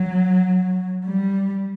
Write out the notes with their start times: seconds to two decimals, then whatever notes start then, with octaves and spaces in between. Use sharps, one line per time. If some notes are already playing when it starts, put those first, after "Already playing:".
Already playing: F#3
1.05 G3